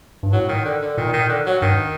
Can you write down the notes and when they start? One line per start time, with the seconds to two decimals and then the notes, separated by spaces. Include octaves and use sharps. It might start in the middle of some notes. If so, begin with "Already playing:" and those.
0.23 G2
0.32 A2 F#3
0.49 D#3
0.65 D3
0.81 D3
0.97 A#2 D#3
1.13 D#3
1.29 D3
1.46 F#3
1.62 G2 D#3